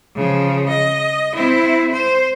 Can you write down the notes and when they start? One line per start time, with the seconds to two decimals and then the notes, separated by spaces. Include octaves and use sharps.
0.16 C#3 F3
0.69 D#5
1.34 C4 E4
1.92 C5